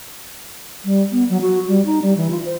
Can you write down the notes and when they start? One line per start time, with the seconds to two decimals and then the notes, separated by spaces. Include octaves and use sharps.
0.85 G3
1.12 B3
1.30 F#3
1.41 F#4
1.68 G3
1.86 D#4
2.02 G3
2.17 E3
2.31 F4
2.45 C5